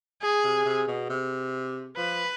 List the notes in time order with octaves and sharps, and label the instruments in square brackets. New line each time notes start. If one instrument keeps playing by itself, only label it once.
[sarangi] G#4
[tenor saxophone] C3
C3
B2
C3
[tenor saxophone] F3 [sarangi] B4